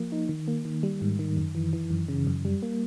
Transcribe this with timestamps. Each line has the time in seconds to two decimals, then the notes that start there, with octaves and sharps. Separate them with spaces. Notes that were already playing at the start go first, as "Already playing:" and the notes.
Already playing: F3 A#3
0.12 D#4
0.29 D#3
0.48 A#3
0.65 D#3
0.83 G3
1.01 G#2
1.19 D#3
1.37 F#2
1.55 E3
1.73 E3
1.91 F#2
2.08 C#3
2.27 F#2
2.45 G3
2.62 A#3